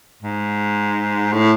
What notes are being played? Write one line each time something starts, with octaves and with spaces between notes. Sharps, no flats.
G#2
A2